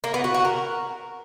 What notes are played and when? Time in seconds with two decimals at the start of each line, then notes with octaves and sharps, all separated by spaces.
0.04 A#3
0.14 B3
0.24 F#4
0.34 F#4
0.45 A#4